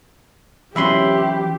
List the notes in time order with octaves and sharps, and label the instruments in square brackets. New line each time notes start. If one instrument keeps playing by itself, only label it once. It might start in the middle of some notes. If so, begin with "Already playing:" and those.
[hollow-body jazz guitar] E3 F#3 C#4 [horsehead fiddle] G4 [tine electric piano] E5 B5 C6